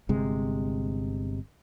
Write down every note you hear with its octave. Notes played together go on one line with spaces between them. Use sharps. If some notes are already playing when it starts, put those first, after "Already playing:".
G1 C3 G#3